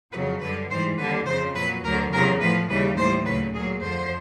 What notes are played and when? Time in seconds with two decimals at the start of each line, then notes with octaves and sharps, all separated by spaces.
0.13 F2 C#3 F#3 B4
0.41 F#2 D3 G3 B4
0.70 G#2 E3 G3 C5
0.98 D#2 D3 G3 B4
1.26 F2 C#3 F3 C5
1.55 A#2 F#3 B4
1.84 D2 D3 F#3 A#4
2.12 E2 C#3 F#3 A#4
2.40 A2 F3 B4
2.69 D#2 C#3 E3 G3 B4
2.97 A2 E3 G3 C5
3.25 D2 C#3 F#3 B4
3.54 A#2 F#3 G#4
3.82 F2 D3 F3 C5